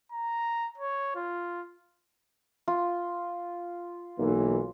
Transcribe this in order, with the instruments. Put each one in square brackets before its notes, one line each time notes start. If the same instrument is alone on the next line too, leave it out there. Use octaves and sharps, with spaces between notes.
[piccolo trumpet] A#5
C#5
F4
[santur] F4
[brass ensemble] B1 E3 A#3